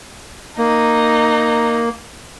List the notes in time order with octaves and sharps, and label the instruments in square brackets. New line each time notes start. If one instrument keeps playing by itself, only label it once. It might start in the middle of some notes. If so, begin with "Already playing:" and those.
[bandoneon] A#3 [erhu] D#4